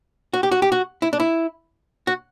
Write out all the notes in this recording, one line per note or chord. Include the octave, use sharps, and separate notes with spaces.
F#4
G4
F#4
G4
F#4
E4
D4
E4
F#4